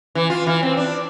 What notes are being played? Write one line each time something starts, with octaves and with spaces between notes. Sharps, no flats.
E3
F4
E3
C4
D4